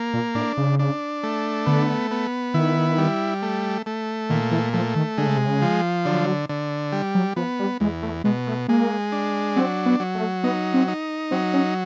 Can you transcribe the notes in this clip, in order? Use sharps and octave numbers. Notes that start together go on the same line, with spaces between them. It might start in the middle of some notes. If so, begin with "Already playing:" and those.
Already playing: A#3
A#2
A2 D4
C#3
D4
A3
D3 B3
B3
D#3 E4
G3
A3
A3
A#2 D#3
E3
F3 A3
D#3
D3 G#3
C#3
C3
C#3
F3
D3 F#3
D3
G3
F#3
F3 B3
G3
E2 G#3
A3
B2 G#3
A3
G#3 A#3
D4
F#3 C4
B3
F#3
A3
B3 D#4
C4
D#4
F#3 C4
C#4